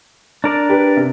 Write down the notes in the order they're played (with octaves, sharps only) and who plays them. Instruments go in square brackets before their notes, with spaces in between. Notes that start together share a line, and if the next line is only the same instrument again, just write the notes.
[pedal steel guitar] D4 A#4 D5
[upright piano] G4 B4
C3